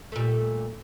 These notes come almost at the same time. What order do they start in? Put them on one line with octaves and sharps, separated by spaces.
A3 A#2 G3